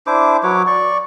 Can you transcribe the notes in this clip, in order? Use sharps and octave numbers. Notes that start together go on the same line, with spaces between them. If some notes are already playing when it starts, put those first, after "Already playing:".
D4 E4 C5 D6
F#3 B4 C#5 D6
D5 C#6